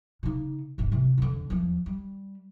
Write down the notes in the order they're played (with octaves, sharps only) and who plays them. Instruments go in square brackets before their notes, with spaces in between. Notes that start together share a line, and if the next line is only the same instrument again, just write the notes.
[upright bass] C#3 D#4
D1 G#1
C3 E3
F2 D3
E2 F3
G3